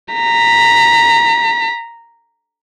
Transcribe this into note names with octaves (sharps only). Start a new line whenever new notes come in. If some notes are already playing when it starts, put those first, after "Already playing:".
A#5 B6